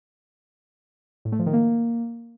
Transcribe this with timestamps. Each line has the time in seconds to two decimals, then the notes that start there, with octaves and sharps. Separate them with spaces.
1.25 A2
1.32 A3
1.39 F3
1.46 D#3
1.53 A#3